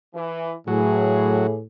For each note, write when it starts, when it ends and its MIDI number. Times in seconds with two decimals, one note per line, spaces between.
0.14 0.53 52
0.67 1.61 45
0.67 1.56 52
0.67 1.47 54
0.67 1.56 68